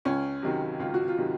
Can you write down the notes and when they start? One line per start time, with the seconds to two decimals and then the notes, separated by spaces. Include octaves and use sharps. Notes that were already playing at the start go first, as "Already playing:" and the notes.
0.05 C#2 C#4
0.42 C3 D#3 F#3
0.80 C#2 F4
0.94 F#4
1.08 F4
1.18 C3 D#3 F#3